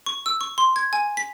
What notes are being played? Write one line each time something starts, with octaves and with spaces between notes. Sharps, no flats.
C#6
E6
C#6
C6
G#6
G#5
B6